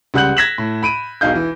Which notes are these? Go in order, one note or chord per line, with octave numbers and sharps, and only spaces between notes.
C#2 G3 F#5 F#6 G6 F#7
G#6 A#6 B6 E7 F#7
A2
B5 D7 D#7
E1 B1 B2 D#4 F5 G6
E3